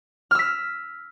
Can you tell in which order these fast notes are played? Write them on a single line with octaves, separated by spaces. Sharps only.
F6 E6 B6